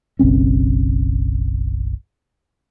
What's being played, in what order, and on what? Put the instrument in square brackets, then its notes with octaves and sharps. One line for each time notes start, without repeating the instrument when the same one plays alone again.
[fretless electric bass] F#1 B1 C4 C#4